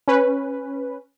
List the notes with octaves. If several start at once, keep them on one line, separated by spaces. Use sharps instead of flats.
C#4 B4